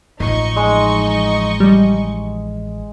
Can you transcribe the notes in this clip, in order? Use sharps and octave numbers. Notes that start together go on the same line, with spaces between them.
A1 F3 D#4 D#5 C#6
G#3
G3